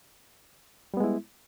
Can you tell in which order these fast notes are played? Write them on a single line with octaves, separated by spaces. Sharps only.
G3 B3 G#3 E4